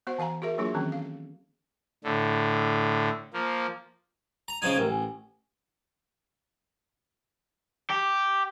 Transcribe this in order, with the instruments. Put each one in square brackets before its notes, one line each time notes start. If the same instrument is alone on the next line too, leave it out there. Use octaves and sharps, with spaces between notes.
[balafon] B3 F#4 C5 F#5
E3 F5 G#5 A#5
F#4 G#4 A#4 E5
F#3 A#3 D4 F4 F#4 G#4
D#3 E3 F#3 C4 C#4
F5
[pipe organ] A2 D3
F3 A#3
[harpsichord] A#5
[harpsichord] C#3 F3 D#4 [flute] G#6
[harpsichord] A1 [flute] A#4
[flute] G#5
[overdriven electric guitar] G4